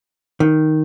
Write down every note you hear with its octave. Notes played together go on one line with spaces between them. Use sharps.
D#3